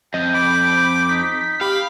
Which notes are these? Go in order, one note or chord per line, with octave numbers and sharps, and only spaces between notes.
F2 D#5 G5
B5 D6
D#4 B6
G4 F5 B5